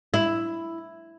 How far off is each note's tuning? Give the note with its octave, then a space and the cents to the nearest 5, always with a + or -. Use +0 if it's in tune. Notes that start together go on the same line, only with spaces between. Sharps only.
E4 +5